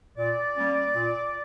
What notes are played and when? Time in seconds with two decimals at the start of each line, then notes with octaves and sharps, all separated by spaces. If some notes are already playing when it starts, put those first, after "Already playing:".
0.17 A#2 D5
0.56 G3 A#3 C#4
0.95 A#2